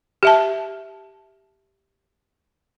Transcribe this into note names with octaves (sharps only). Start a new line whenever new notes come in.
G4 E5 A5